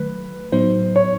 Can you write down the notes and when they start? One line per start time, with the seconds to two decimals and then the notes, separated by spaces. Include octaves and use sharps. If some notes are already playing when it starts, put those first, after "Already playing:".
Already playing: D#3 F#3 A3 B4
0.52 A2 F#3 B3 D#4 C5
0.96 C#5